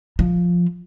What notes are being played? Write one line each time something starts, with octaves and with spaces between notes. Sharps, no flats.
F3